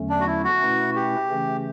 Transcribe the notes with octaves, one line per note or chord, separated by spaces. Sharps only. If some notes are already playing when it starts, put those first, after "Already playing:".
Already playing: E2 D3 F#3 A3 C#4
D4
F#4
E4
F#4
B2 A3 C#4 E4 B4
G4
C#3 E3 A3 C#4